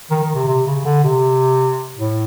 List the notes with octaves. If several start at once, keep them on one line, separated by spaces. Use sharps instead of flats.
D#3
D#3
C3
C3
C#3
D3
C3
A2